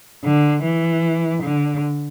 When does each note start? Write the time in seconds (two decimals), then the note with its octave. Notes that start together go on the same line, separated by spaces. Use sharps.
0.24 D3
0.63 E3
1.43 D3